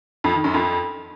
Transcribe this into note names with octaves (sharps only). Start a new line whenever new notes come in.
F2
D#3
F#2
F2